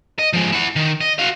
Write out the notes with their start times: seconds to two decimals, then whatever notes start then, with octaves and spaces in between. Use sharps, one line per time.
0.19 D#5
0.33 F3 G#3
0.52 E4 F#5
0.76 D#3
1.01 D#5
1.19 F#4 F5